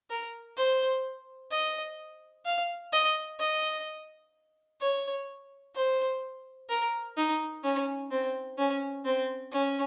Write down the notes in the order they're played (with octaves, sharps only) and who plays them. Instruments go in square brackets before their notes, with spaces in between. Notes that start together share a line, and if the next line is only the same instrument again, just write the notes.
[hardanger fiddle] A#4
C5
D#5
F5
D#5
D#5
C#5
C5
A#4
D#4
C#4
C4
C#4
C4
C#4